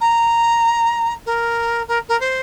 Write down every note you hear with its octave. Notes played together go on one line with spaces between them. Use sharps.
A#5
A#4
A#4
A#4
C5